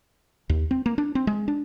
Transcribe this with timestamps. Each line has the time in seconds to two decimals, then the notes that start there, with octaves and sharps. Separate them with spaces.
0.49 D#2
0.71 C4
0.86 A#3
0.98 D4
1.15 C4
1.27 G#3
1.48 D4